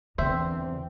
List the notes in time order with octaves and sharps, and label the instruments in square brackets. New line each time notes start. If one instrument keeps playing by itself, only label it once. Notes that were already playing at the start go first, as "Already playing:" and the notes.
[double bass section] E2 C4 [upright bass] D3 [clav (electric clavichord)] C5 E5